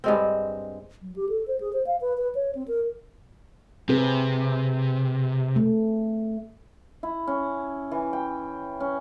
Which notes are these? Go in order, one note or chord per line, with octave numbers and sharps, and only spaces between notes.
G2 G#3 C4
F#3
G4
A4
C5
G#4
C5
F5
B4
B4
C#5
C4
A#4
C3 C4 G#4 B4
A3
E4
C#4
E3
G5
C#4